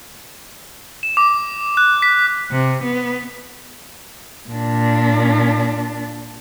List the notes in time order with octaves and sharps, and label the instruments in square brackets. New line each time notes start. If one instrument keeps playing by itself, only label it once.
[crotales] E7
D6
F#6
B6
[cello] C3
B3
A#2 D4